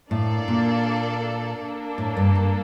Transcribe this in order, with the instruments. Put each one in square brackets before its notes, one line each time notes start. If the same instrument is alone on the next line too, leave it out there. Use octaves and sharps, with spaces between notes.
[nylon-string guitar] A2 [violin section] A#3 D4 A4 D5 F5
[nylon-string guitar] A#2
[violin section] A#3 D4 A4
[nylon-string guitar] A2
G2
G2